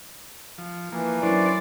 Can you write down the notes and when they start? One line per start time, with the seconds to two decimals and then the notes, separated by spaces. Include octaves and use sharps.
0.58 F3
0.92 E3 F3 A#3
1.23 F#3 C#4 D4 E4 A#4 C5 D5